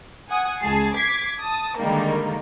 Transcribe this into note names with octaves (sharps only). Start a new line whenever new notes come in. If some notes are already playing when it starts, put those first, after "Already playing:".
F#5 G#5 D#6
C#2 G#4 A5 C7
D6 G#6 B6 C7
A5 D#6
D3 D#3 G3 G#3 A#3 D#4